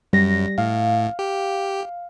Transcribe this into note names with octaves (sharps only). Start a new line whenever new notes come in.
F#2 G3 A#6
A2 F5
G4